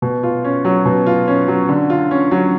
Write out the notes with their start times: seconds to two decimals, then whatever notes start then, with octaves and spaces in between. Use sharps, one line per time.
0.02 B2
0.23 F4
0.44 C#4
0.65 F#3
0.85 B2
1.06 F4
1.28 C#4
1.48 F#3
1.69 D3
1.90 F4
2.11 C#4
2.31 F#3